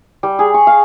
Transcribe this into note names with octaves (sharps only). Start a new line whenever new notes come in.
G3
G#4
C#6
F5